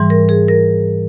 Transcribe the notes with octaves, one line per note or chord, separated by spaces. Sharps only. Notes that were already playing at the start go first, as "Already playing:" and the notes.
Already playing: G#2 E3 G3
A#4
G#4
A#4